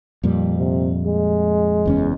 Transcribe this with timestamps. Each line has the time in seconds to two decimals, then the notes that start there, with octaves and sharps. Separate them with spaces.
0.24 F2 A#2 G3
0.57 C3
1.06 G#3
1.86 F#1 E2 C#4